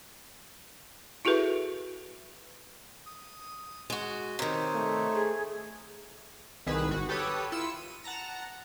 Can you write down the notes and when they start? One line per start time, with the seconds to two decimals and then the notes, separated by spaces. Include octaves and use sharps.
1.25 E4 F#4 G#4 A4 B4 E5
3.06 D#6
3.90 G#3 F#4
4.39 C3 D#3 D#4 C5 C#5
4.75 A3
5.14 G#4
6.66 C2 D#3 G#4 B4 E6
6.89 G#1 F#4
7.09 G4 A4 B4 C#5 D#6
7.52 E4 F4 E6 C#7 E7
7.77 D#7
8.04 F#5 A5 A#5 A#6